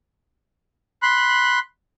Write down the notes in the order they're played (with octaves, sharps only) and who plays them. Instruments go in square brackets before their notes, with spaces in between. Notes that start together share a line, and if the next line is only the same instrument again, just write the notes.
[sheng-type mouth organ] B5 C6 F#6